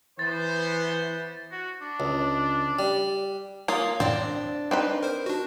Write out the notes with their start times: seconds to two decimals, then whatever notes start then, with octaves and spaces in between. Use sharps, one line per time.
0.19 E3 B3 C5 A6
1.52 F#4
1.82 D4
2.00 C#2
2.79 G3
3.68 A#3 F4 C#5 F5 D#6
4.00 A2 C4 D4 D5
4.71 C4 D#4 B4
5.03 A#4 C5
5.26 D4 F#4